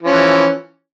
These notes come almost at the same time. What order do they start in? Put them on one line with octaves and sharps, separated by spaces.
F3 C#4 E3